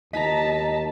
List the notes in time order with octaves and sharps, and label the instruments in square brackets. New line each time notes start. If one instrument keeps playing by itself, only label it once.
[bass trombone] D#2 [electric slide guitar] D#5 [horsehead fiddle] A5 [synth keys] A#5 B6